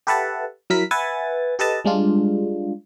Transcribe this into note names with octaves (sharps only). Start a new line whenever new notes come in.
G4 A4 B4 E5 F#5 A5
F#3 E4 A#4 B6
B4 E5 F#5 G#5 A6
G4 A4 B4 D#5 A5
G3 G#3 D4 F4